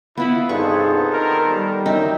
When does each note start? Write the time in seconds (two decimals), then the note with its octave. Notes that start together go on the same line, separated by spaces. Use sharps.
0.17 B3 E4 F4 B4 B5
0.49 G2 C3 B3 D#4 G#4 A4 C5 C#6
1.12 D#3 A#4
1.49 G3
1.86 F#2 D#4 E5 G5